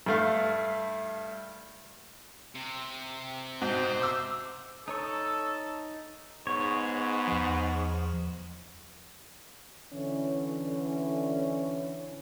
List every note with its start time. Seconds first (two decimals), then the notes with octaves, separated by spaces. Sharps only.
0.06 G2 A3 F5
2.55 C3
3.62 G#2 B2 C5
4.02 D6 E6
4.88 D#4 A4 C#5 C#6
6.47 G#2 B3 C#5
7.28 E2 F3
9.93 D3 E3 C#4